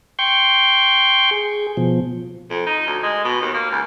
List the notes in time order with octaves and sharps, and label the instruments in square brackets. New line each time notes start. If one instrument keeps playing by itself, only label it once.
[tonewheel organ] G5 C6 C#6 G6
G#4
B2 F3
[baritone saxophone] F2
D#4
D2
G#3
B2
D#2
A#3
C#2